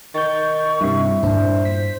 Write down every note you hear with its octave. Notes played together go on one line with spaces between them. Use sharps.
D#3 C#6 G6 A6
G2 C3 E4
G2 A#2 B3 D4 C5
B6